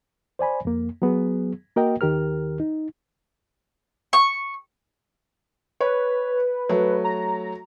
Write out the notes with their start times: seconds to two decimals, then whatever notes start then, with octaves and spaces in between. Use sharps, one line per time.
0.39 C5 D5 G#5 B5
0.65 F2 A#3
1.02 F#3 B3 G#4
1.76 A#3 F#4 A#4 D#5 G5
2.01 D#2 D#3 G4 A#4 F6
2.60 D#4
4.13 C#6
5.81 B4 C#5
6.69 F#3 A3
7.04 A#5